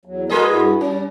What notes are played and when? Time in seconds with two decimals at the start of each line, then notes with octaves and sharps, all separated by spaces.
0.05 E2 F#3
0.30 G3 F#4 G#4 A#4 B4 D#5
0.48 G2 E4 F#4
0.81 G3 C#4